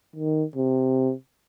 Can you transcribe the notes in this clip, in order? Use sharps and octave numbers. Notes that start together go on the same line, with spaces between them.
D#3
C3